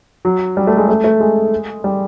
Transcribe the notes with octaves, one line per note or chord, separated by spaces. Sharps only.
F#3
G3
A3
G#3
A3
A3
G#3
G3